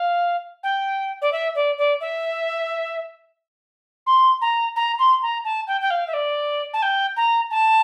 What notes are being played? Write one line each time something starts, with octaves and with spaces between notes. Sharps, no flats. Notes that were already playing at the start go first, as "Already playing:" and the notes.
Already playing: F5
G5
D5
E5
D5
D5
E5
C6
A#5
A#5
C6
A#5
A5
G5
G5
F5
E5
D5
A5
G5
A#5
A5